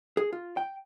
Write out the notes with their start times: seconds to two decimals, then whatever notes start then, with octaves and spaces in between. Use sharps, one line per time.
0.17 G#4
0.33 F4
0.57 G5